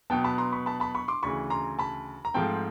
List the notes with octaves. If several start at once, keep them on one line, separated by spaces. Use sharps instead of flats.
B2 F#3 B3 G5 A5
A5 B5
A#5 C6
B5 C#6
A5 B5
A5 B5
B5 C#6
C6 D6
D2 C#3 E3 B5 C#6
A#5 C6
A5 B5
A#5
G#2 F3 A3 C4 G5 A5